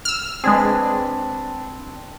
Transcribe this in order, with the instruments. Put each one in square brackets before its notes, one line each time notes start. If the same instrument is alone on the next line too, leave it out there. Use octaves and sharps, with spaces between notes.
[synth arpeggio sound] E6 F6
[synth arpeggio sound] G#3 G#4 [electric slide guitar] C4 D4 B4